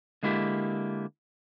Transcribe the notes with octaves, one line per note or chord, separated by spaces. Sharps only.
D3 G#3 A#3 E4 G4